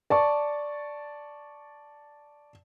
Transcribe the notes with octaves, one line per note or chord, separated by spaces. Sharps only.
D5 A5 C#6